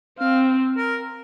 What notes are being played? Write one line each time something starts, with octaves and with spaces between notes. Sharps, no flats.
C4 F5
A#4